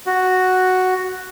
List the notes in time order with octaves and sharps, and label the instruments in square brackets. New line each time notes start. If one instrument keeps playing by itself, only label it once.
[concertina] F#4